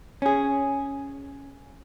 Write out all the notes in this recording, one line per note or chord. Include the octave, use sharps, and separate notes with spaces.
C#4 G#4